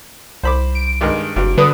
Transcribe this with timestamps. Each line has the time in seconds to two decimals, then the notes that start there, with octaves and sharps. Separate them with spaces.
0.43 C2 C5 B5 D6
0.75 D7
1.01 G2 D#3 G#3
1.36 F#1 G2 F#3
1.58 D3 G3 B4 D#6